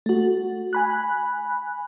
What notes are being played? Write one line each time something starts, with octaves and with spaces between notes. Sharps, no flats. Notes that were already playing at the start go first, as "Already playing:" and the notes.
A3 F#4
G#5 B5 F#6